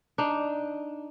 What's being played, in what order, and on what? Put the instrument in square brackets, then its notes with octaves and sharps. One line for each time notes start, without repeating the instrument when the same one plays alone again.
[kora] D4 D#4